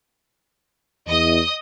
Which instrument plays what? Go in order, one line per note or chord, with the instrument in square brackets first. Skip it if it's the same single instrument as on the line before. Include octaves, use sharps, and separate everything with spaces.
[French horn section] E2 [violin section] D#5 D#6